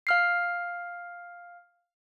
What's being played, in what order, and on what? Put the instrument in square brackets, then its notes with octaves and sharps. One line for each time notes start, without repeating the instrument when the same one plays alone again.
[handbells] F5 F6 C7